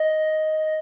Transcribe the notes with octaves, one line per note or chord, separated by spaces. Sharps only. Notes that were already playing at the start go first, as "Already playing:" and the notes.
Already playing: D#5